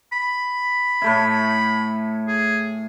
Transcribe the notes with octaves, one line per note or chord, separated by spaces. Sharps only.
B5
A2 A3 E4
G#4